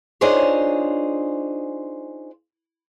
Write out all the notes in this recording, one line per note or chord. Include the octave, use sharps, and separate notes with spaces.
D4 D#4 F4 G#4 C5 C#5